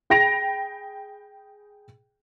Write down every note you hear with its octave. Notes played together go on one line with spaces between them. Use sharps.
G#4 G5 B5 A#6 D7 F7